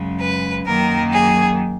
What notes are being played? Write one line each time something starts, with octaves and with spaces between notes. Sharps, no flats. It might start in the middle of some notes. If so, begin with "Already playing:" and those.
Already playing: F#2 C#3 G#3
B4
F#2 D#3 F#3 A#3 A#4
G#4